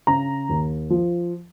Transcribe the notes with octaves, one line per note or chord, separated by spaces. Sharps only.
C#3 A#5
D#2
F3